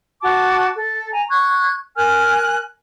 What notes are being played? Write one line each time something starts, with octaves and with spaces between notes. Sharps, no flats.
F#4 A5 D6
A4
G#5 A#5
C#6 F#6 G#6
A#4 G#5 F6 F#6